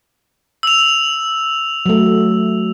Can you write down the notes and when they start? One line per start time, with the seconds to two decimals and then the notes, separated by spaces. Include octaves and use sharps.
0.63 E6 F7
1.86 F#3 A3